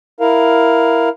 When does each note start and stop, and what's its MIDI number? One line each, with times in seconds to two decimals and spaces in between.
0.20 1.09 64
0.20 1.09 70
0.20 1.09 77